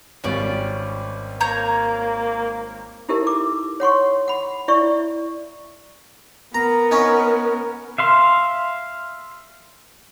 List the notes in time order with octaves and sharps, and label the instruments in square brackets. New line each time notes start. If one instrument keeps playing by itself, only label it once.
[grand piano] G#1 G3 C#4 [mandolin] F4 D5
[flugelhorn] A#3 [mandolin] C#5 A#5 G6
[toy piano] D#4 E4 G4 A4 A#4 E5
D6
C#5 F#5 C6 C#6
F#5 B5
E4 D5 E5 C#6
[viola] B3 A#4 [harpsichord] A#5
[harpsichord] C#4 D#4
[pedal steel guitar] E5 F5 C6